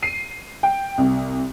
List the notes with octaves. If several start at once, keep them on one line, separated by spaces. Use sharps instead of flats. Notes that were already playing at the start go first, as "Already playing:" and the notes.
C7 D#7
G5
C2